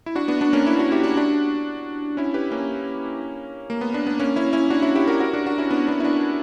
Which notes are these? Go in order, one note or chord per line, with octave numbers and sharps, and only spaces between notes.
E4
D4 F#4
B3 D4
B3 D4
A#3 C#4
C#4 E4
D4 F#4
E4 G4
D4 F#4
D4 F#4
C#4 E4
G4 B4
A#3 C#4
A#3
B3
B3 D4
B3
A#3 C#4
C#4 E4
C#4 E4
D4 F#4
C#4 E4
E4 G4
F#4 A#4
F#4 A#4
D4 F#4
D4 F#4
C#4 E4
B3 D4
B3 D4
E4
B3 D4